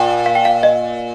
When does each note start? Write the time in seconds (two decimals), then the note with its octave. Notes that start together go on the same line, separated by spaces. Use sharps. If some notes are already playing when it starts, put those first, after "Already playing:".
Already playing: A#2 G5
0.26 F5
0.35 G5
0.45 F5
0.63 D#5